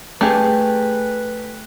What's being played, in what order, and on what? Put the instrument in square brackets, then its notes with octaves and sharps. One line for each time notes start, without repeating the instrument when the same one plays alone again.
[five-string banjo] A3 G4 G#4 [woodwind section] B4